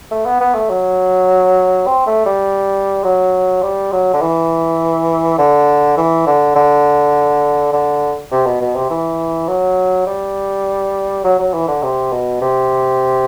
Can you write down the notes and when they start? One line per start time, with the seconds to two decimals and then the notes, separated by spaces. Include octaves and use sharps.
0.11 A3
0.26 B3
0.41 B3
0.55 A3
0.70 F#3
1.87 C4
2.07 A3
2.26 G3
3.04 F#3
3.63 G3
3.92 F#3
4.13 D3
4.22 E3
5.38 D3
5.97 E3
6.27 D3
6.56 D3
7.73 D3
8.32 C3
8.46 B2
8.61 B2
8.76 C3
8.90 E3
9.48 F#3
10.07 G3
11.24 F#3
11.39 F#3
11.53 E3
11.68 D3
11.83 C3
12.12 B2
12.42 C3